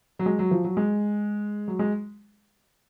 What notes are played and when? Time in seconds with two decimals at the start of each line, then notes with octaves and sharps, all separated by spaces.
0.19 F#3
0.26 G#3
0.39 F#3
0.51 F3
0.64 F#3
0.77 G#3
1.68 F#3
1.79 G#3